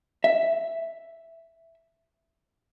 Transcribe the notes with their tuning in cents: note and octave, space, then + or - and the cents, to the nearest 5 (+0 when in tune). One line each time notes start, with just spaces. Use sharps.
E5 +5